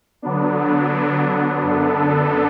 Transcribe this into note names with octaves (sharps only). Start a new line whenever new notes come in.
D3 F#3 B3 D4
F#2 D3 B3 D4 A4